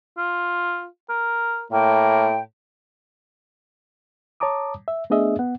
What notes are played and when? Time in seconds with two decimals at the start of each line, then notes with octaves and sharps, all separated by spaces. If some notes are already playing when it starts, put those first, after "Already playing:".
0.18 F4
1.10 A#4
1.72 A2 A#3 G5
4.40 C#5 A5 A#5 D6 D#6
4.88 E5
5.10 A3 B3 D4 G#4 D#5 E5
5.39 B3 F#5